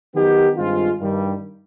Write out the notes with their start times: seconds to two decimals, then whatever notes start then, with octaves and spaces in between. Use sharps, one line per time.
0.14 D#3 F#3 B3 D#4 G4
0.57 G2 D#3 G#3 C4 F4
1.00 G2 D#3 G3